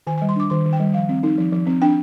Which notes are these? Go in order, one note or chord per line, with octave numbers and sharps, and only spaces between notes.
D#3 G#5
G#5
G3
C6
D4 D6
D#3 C6
D#3
G5
G3
F3 F5
C4
D#4
F3
F3
C4
D4 G5